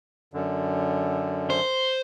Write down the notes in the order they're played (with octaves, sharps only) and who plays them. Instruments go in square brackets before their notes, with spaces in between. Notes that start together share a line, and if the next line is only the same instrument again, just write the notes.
[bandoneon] F#2 D3
[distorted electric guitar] C5